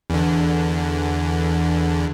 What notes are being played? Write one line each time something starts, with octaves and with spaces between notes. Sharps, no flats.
E2 D3